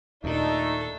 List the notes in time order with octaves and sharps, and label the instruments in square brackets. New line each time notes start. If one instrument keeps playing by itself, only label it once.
[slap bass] D#2 A#2 [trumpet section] A3 [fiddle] D4 A4 [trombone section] D#4